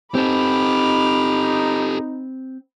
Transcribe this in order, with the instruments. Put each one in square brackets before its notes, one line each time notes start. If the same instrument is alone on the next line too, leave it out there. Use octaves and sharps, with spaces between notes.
[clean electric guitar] C4 [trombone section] D#4 [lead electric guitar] G4 A4 [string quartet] B5 D6 F6